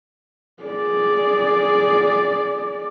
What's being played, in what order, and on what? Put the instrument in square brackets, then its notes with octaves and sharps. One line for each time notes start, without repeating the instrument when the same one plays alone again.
[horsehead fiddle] G#4 D5